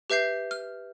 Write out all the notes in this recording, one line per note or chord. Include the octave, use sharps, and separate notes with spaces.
G4 B4 E5 G6 C7
F6